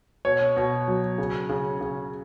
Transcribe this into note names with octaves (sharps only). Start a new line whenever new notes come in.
B2 C#5
B2
F#3
C#3
C#3
C#3